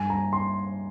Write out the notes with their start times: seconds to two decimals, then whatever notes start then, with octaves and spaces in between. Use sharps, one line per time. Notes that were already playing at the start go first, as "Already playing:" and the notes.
Already playing: G2 G#5
0.10 A#5
0.33 C6